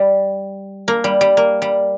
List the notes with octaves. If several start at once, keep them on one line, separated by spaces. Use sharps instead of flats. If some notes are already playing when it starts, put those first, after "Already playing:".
Already playing: G3
A#3
G3
G3
A#3
G3